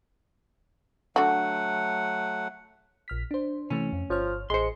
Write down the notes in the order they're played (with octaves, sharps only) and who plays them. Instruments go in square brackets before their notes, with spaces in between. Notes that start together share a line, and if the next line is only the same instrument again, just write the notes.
[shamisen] D3 F#4 [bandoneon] F#3 A3 F#5
[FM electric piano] A#1 F6 B6
D4 C5
[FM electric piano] C3 E3 A3 [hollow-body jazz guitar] C#4
[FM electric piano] F2
[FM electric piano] G1 C#5 F6 [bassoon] F3
[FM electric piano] A1 C#7 [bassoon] G#3 [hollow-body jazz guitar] C5 C6